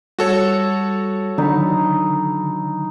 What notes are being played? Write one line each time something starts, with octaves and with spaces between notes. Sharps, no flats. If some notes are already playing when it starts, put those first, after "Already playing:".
G3 F#4 A4 C#5
D3 D#3 F#3 D#4 B5